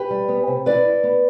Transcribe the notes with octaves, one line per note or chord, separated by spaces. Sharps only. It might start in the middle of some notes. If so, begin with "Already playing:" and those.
Already playing: G4 B4
G3
B3
C3
E4 B4 D5
E4
B3